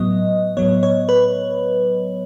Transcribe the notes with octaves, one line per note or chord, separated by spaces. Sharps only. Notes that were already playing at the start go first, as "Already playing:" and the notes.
Already playing: A2 F#3 B3 D#5
A2 F#3 B3 C#5
C#5
B4